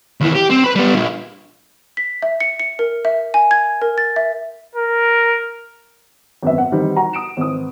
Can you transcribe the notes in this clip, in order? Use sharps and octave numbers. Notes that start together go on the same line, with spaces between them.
D#2 E3
G4
C4
B4 B5
G3 B3
F3 D4
B6
E5
C#7
C#7
A#4
E5
G#5
G#6
A#4
A6
E5
A#4
G#1 F#2 B3 E5
F#5
D#3 E3 G3 C4 D#4
F#4 F#5 A#5
D#6 D7 E7
G#1 E3 D#6